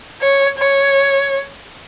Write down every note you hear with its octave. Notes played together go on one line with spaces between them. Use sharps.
C#5
C#5